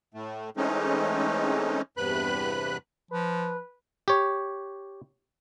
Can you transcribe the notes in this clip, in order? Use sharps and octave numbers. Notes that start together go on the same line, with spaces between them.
A2 A3
E3 G#3 A3 C4 C#4 D#4
E2 G2 C3 B4 B5 F#6
F3 B4
G4 C#5